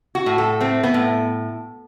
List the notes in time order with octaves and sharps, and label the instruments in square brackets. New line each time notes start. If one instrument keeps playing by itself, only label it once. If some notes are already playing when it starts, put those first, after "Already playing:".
[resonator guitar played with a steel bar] F#4
A2
A4
A3 C4
B3
A2